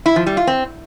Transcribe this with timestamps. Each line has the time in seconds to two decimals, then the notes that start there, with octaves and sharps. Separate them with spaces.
0.06 E4
0.16 F3
0.26 G3
0.37 F4
0.47 C4